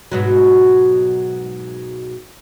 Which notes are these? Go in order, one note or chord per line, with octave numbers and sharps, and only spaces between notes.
G#2 B2 F#3